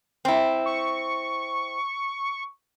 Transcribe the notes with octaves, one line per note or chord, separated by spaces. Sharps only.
C4 E4
C#6